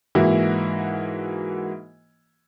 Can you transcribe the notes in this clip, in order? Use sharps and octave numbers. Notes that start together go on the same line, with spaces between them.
G#2 E3 A#3 E4 F#4